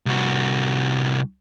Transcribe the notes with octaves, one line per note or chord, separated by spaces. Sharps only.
C2 F#4